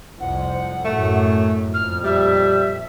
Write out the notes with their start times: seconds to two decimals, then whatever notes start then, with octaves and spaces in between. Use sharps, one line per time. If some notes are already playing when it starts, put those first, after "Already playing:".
0.20 C2 F2 F#5
0.85 F#2 A2 A3
1.73 F2 A#2 F6
2.04 G3 E5